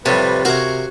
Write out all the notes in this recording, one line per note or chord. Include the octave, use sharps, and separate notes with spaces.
A2 C3 F3 G3 B4
C3 F#4 A#4 C#5 E5 F5